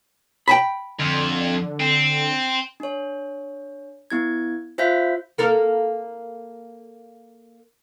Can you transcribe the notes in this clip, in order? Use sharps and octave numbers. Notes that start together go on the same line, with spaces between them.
G5 A5 B5
F2 D3
C4
D4 C#5
B3 E4 G#6
F4 C5 E5 F5 G6 B6
A#3 A4 A#4